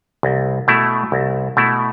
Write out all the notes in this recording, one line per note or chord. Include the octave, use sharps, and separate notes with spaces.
C2
B2 A3 E4
C2
B2 A3 E4